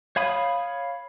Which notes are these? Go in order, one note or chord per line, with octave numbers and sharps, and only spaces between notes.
C#5 F5 B5 D#6